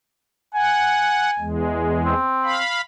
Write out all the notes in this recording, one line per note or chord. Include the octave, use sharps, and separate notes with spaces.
F#5 G#5
E2 G#3
C4
F5 B5